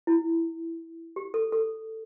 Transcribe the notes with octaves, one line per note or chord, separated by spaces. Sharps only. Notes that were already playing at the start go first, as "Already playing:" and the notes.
E4
G4
A4
A4